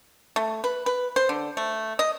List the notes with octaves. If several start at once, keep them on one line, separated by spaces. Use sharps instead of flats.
A3
B4
B4
C5
D3
A3
D#5